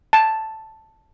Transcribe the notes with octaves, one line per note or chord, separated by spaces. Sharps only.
A5